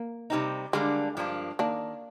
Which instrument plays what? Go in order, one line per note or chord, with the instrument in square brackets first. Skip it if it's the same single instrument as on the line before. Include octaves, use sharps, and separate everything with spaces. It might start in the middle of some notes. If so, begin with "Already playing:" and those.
Already playing: [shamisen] A#3
[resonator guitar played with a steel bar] C3 G3 C4 D#4
[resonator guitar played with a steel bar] D3 G3 A#3 D4 [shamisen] G#3
[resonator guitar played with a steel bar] G2 F3 A#3 D4
[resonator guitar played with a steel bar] D#3 [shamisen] A#3 D4